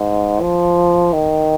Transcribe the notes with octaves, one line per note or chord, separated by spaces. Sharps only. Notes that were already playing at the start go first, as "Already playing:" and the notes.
Already playing: G#2
F3
D#3